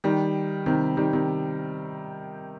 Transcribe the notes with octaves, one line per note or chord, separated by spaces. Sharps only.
D#3 G3
C3 D#3
D#3 G3
C3 D#3